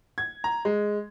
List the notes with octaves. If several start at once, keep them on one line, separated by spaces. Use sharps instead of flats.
G#6
A#5
G#3